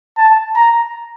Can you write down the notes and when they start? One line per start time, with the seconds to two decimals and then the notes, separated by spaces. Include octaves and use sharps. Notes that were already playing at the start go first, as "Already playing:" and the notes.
0.18 A5
0.56 A#5